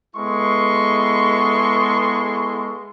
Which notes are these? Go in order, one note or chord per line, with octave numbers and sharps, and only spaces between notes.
G#3 B3 E4 A4 C6 C#6